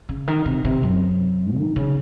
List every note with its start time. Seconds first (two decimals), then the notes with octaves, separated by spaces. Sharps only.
0.09 C#3
0.27 D#3
0.46 C3
0.65 C3
0.83 F#2
1.57 D#3
1.76 C#3